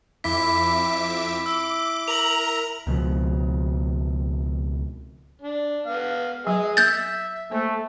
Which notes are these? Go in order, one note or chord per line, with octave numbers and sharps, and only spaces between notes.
F2 E4 E5 D6 B6
D6 E6
A#4 A#5 F7 F#7
C#2 B2 F3
D4
B3 F5
F#3 G#4 D#5
E5 G6 A6
A3 A#3 C5